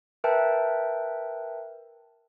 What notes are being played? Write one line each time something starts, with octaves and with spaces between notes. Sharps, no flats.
A#4 B4 E5 G5 A5